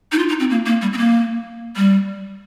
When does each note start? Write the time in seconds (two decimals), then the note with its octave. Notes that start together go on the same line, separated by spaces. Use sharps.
0.12 D#4
0.19 F4
0.29 D#4
0.40 C4
0.50 A#3
0.66 A#3
0.82 G3
0.93 C4
0.98 A#3
1.76 G3